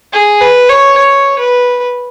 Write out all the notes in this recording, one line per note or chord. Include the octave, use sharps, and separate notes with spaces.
G#4
B4
C#5
C#5
B4